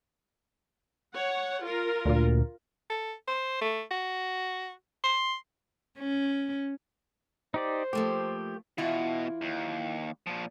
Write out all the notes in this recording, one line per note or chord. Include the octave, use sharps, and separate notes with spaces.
C#5 F#5
F4 A#4
D2 A#2
A4
C5
A3
F#4
C6
C#4
D#4 G4 C5 D5
F3 A3 A#3 G4
B2 E3 E4 F4
D#2
A#2 F3